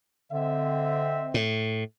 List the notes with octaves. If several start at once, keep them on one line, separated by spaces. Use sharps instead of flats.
D3 C4 D#5 E5
A2